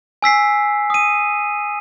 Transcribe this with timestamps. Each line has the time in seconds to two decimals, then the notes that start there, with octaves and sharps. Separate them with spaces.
0.22 G#5 E6 B6 C7
0.90 D#6 D#7